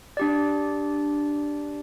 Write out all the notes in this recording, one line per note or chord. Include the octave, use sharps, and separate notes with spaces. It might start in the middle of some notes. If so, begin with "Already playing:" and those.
D4 G4 D5